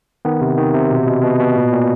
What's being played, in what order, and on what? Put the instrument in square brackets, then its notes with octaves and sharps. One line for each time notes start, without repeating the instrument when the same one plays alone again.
[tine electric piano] D#3 B3
C3
D#3
C3
B2
B2
B2
B2
A#2
A#2